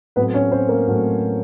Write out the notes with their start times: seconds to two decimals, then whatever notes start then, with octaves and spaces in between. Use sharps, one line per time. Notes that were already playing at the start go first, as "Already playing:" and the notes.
0.16 A2 F#3 A3 B3 C4 B4
0.34 C#4 C#5
0.52 C4 C5
0.69 A#3 A#4
0.87 A2 F#3 A3 C4